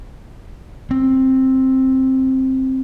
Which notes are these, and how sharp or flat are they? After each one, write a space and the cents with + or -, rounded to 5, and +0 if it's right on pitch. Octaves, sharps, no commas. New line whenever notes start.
C4 +10